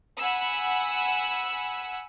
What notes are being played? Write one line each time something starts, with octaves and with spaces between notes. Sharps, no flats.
F#5 G#5 B5 E6